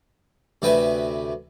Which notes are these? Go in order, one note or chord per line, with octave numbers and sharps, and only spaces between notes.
D2 C3 G4 B4 E5 G#5